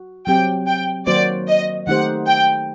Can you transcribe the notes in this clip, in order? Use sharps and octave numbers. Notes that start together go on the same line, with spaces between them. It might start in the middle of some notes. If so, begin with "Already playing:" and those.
Already playing: F#4
F#3 C4 G4 G5
G5
D#3 F#3 A#3 F#4 C5 D5
D#5
D#3 A3 D#4 G4 C5 F#5
G5